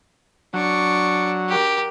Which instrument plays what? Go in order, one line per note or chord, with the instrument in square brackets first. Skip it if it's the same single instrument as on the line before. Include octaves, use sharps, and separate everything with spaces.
[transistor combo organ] F#3 [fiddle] D4 C#6
[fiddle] G4 A#4